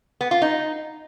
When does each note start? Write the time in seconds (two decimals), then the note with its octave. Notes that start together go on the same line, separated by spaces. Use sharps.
0.21 B3
0.31 F4
0.42 D#4